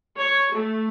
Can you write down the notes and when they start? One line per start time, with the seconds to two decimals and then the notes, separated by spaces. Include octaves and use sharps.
0.16 C#5
0.53 A3